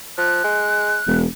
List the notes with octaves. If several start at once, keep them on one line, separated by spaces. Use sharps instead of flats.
F3 F#6
G#3
E1